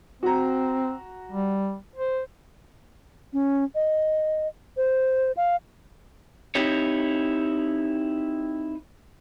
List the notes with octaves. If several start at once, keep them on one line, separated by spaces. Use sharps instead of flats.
C4 F#4 A#5
G3
C5
C#4
D#5
C5
F5
C4 D#4 E4 G4 C#5